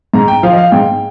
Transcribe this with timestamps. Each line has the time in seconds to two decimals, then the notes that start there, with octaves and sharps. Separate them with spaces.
0.14 G#2 A#5
0.28 G5
0.43 F3 F5
0.53 D#5
0.58 F5
0.71 G#2 G5